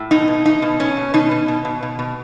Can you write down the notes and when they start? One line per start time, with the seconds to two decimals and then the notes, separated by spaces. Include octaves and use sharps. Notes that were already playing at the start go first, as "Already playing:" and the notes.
Already playing: A2
0.11 B2 D#4
0.28 B2
0.45 B2 D#4
0.62 B2
0.79 B2 C#4
0.97 B2
1.14 B2 D#4
1.31 B2
1.48 B2
1.65 B2
1.83 B2
1.99 B2